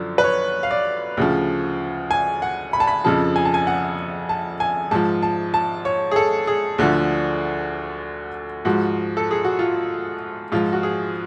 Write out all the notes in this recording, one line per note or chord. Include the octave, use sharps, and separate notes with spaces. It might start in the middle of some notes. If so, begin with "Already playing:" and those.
Already playing: F#2 D3 F3
B4
C#5
F5
D5
D2 C#3 F3
G#5
F#5
B5
A5
B5
F2 C#3 F3 A5
G#5
A5
G#5
F#5
A5
G#5
G#2 F3 A5
A5
A5
C#5
G#4
A4
G#4
D2 D3 F3
G#2 F3 F#4
A4
G#4
F#4
F4
G#2 F3 F4
F#4
G#4